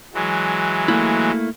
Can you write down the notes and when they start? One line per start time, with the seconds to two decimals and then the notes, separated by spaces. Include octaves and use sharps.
0.14 E3 F#3 G#3
0.88 A3 A#3 E4